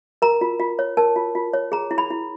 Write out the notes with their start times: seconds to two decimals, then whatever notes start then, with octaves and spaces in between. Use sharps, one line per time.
0.22 A#4 A#5
0.41 F4
0.60 F4
0.79 C#5
0.97 A#4 A5
1.16 F4
1.35 F4
1.53 C#5
1.72 G#4 A#5
1.91 E4
1.98 B5
2.10 E4